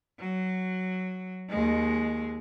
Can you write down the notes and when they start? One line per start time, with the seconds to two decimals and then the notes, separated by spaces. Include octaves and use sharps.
0.19 F#3
1.49 D#2 G#3